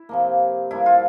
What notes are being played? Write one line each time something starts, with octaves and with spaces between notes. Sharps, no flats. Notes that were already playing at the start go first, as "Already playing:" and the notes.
Already playing: E4
C3 F3 A#3
G2 F3 A#3 E4
F4